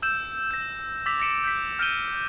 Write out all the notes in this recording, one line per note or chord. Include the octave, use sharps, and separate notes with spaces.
E6 G6 E7
G6 A#6
D6 E6 A6 B6 F7
D6 A6 A#6 C#7 D7 E7
G6 B6
F6 G6 A#6 D7 D#7 G7